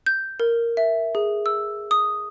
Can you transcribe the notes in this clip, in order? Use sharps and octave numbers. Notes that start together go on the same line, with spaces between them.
G6
A#4
E5
G#4
E6
D#6